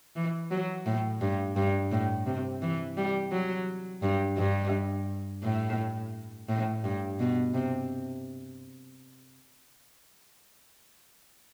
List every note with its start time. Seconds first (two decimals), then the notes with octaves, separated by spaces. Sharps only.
0.16 E3
0.51 F#3
0.86 A2
1.21 G2
1.56 G2
1.91 A2
2.26 C3
2.62 E3
2.97 G3
3.32 F#3
4.03 G2
4.37 G2
5.43 A2
6.49 A2
6.84 G2
7.20 B2
7.54 C3